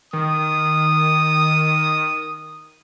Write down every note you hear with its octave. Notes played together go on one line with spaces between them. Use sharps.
D#3 D#6